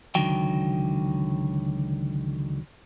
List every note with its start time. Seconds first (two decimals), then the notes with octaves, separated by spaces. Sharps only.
0.15 C#2 D3 D#3 F#3 G5